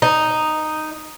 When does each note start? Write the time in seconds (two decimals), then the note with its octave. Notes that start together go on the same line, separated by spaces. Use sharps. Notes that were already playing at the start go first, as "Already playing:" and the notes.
0.02 D#4